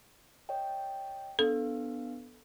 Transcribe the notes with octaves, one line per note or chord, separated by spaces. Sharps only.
C#5 D#5 G5
B3 D4 A4 F5